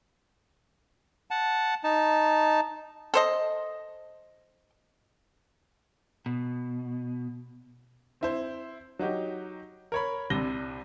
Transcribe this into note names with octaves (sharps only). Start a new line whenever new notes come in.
F#5 A5
D#4 A5
A4 C5 D#5
B2
C4 E4 C5
F#3 D#4 F#4 G4
A#4 C#5 B5
C2 C3 D4 A#6 G7